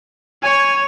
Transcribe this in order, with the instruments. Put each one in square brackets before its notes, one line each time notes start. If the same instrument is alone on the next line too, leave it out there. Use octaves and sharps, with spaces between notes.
[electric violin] C#5 [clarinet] G#5